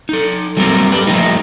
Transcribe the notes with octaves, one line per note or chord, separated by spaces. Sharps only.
D#4 A4
F#3 G3 A#3 C4 A4 A#4
G4 B4
F3 G3 A3 A#3 D#4